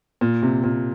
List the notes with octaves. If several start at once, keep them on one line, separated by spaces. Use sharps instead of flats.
A#2
C3
A#2